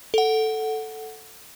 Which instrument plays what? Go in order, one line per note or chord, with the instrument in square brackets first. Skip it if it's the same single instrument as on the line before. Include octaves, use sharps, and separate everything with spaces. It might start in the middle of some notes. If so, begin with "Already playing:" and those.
[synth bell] A4 F#5